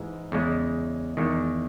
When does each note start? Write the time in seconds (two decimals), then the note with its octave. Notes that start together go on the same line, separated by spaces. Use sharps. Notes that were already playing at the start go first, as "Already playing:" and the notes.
Already playing: G#2 E3 G#3
0.32 E2 C#3 G#3
1.17 E2 D#3 G#3